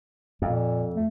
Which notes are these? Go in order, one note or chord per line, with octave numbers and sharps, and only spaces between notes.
F2 A#2
A3